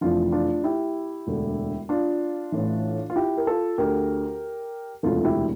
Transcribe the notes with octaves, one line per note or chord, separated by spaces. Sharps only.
F1 F2 E3 D4 F4
D4 F4
E4 G4
E1 D2 D3
D4 F4
A1 A2 E3
F4
E4 G4
A#4
F4 A4
D2 D3 G4 A#4
E1 D2 C3 E3 F4 A4
E4 G4